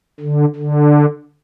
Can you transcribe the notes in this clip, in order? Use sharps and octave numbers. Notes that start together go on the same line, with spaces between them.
D3
D3